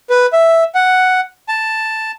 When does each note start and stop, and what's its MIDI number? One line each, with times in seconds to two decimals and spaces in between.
0.10 0.26 71
0.33 0.64 76
0.75 1.20 78
1.49 2.11 81